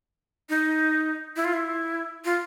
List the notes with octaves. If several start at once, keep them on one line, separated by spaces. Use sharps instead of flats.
D#4
E4
F4
E4
F4